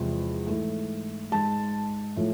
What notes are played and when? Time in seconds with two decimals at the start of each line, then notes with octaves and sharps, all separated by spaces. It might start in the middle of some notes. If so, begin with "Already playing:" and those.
Already playing: E2 C3 F3 G#3
0.47 G#2 E3 A3
1.32 G#2 G#3 A5
2.16 A2 F3 A3